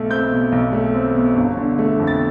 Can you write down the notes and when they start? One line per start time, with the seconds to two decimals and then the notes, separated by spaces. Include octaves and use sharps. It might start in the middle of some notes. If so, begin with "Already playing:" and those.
Already playing: B1 A3
0.10 C4 G6
0.31 B2
0.52 B1
0.73 A3
0.94 C4
1.15 B2
1.35 G1
1.57 D3
1.79 A3
1.99 F2
2.07 A6